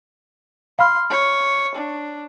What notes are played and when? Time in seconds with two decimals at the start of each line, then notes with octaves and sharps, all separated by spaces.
0.79 F5 B5 C6 F6
1.10 C#5
1.74 D4